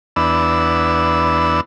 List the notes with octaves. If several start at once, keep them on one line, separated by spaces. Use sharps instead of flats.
E2 B3 D4 E6